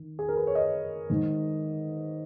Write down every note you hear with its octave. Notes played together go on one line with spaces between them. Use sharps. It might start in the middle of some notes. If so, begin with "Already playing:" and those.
Already playing: D#3
G#4
A#4
B4
C#5
D#5
G#2 D#3